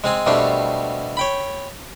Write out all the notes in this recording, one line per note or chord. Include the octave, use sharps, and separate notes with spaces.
G#3 C4 G#5
B2 G3 A3 C4 D4 G4
C#5 G5 B5